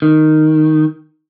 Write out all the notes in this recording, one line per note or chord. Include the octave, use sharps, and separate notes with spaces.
D#3